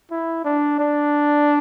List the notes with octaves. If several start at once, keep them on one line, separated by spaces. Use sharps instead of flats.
E4
D4
D4